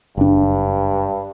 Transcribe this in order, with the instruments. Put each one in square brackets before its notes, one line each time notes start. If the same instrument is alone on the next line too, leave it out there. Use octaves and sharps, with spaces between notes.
[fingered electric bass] F#1 D4 [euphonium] G2